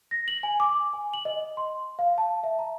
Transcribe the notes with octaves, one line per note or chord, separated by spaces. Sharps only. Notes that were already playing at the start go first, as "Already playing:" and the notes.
A#6
F#7
G#5
D6
G#5
F#7
D#5
C6
F5
A5
E5
A#5